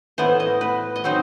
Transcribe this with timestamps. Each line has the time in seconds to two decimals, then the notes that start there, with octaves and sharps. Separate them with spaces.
0.18 A2 E3 B3 C5
0.40 D#5
0.61 B4
0.96 D#5
1.04 F#3 C4 D#4 C5